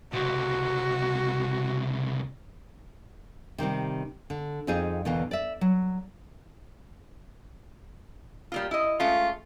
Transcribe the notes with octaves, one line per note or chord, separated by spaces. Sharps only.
C#2 C3 F#4
C3 D#3 G3 C4
D3
F2 C4 D#4 F4 G#4
E2 B2 D3 E3 A#3 F5
D5 E5
F#3
G3 A#3 F4
E4 D#5
G#3 A3 C#4 F4